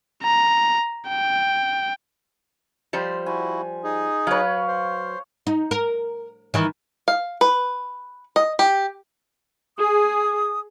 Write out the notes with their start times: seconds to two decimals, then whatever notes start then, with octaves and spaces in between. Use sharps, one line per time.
0.23 A#5
1.08 G5
2.93 F3 G3 C5
3.26 E4 F#4 G#5
3.84 D#4 G#4
4.27 F#3 B4 C#5 F5
4.68 C5
5.47 D#4
5.71 A#4
6.54 D#3 E3
7.08 F5
7.41 B4
8.36 D#5
8.59 G4
9.78 G#4 D#6